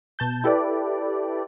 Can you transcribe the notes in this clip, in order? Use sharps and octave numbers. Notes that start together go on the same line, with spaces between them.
B2 A5 G6
E4 G4 A4 B4 D5